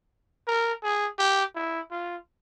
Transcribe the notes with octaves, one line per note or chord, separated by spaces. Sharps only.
A#4
G#4
G4
E4
F4